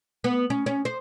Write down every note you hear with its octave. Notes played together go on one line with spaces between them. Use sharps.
B3
C#4
C#4
C5